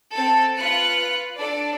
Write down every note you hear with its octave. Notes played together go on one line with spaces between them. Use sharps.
C4 A4 A5
F4 B4 F#6 C#7
D4 A4 D5